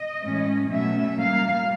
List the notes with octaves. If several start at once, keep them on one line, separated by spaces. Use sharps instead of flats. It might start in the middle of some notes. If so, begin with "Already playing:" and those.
Already playing: D#5
A2 E3 G#3 C#4
B2 F#3 A3 C#4 E5
A#2 G3 A#3 F5